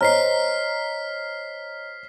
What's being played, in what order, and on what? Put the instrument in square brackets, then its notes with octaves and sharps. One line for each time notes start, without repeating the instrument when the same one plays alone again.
[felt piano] C5 A#5 [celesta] C#5 D#5 [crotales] F6 B6 C7